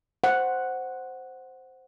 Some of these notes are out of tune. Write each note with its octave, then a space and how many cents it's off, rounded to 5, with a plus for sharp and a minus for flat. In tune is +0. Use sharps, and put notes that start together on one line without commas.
C5 +0 F#5 +0